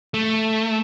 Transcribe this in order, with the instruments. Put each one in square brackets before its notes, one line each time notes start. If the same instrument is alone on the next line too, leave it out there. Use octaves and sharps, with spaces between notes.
[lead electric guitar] A3